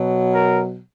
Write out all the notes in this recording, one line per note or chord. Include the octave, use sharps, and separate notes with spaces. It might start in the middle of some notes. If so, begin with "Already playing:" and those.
Already playing: B2 F#3
A#4